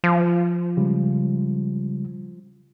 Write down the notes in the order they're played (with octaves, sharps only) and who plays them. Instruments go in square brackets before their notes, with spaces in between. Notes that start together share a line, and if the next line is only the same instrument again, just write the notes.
[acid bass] F3
[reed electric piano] C#3 G3 G#3